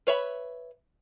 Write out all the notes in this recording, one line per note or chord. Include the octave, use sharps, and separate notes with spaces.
B4 C#5 E5 B5